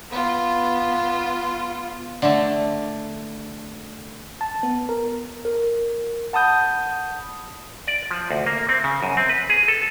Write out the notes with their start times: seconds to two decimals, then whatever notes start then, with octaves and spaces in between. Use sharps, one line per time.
0.10 B3 F4
2.22 D3 A3
4.41 A5
4.63 B3
4.89 A#4
5.45 A#4
6.33 F#5 A5 B5 D#6 G6
7.87 D5
8.11 F3
8.31 D2
8.46 A#3
8.69 C4
8.84 C#3
9.03 F#2
9.17 C4
9.29 B4
9.49 G#4
9.68 A4